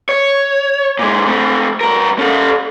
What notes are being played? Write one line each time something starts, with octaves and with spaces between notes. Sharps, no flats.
C#5
A#2 G#3
A3 C4
G2 A#4
C#4 A4